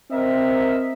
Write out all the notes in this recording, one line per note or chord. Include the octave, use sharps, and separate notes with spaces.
C4 A#4 D#5 E5